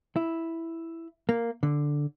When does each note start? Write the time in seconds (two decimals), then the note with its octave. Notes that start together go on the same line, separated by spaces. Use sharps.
0.16 E4
1.29 A#3
1.63 D3